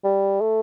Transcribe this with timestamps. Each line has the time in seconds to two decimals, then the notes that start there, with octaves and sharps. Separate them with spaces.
0.04 G3
0.41 A3